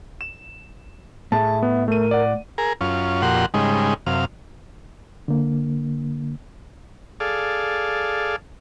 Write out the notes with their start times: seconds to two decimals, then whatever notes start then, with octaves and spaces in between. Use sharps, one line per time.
0.21 E7
1.32 A2 G#4 E5 A5
1.62 B3
1.88 A3 A#4 D#7
2.11 D5 F#5
2.58 G#4 A#4
2.81 F#2 C#4 F4
3.22 F2 A#2 F#4 G4 F#5 C6
3.54 G#2 C#3 G3 G#3 D#4
4.06 F#2 C3 F5
5.28 D3 A#3
7.20 G#4 A4 D5 F5